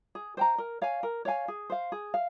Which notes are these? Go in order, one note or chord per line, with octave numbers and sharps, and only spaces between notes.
G#4
C5 G5 A#5
A#4
C#5 F5 G#5
A#4
C#5 F5 G#5
G#4
C5 F5
G#4
F5